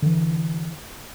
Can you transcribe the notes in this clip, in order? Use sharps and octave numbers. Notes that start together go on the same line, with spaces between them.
D3 E3